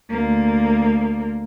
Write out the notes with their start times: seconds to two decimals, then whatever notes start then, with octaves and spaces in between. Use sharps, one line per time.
0.10 D2 A#3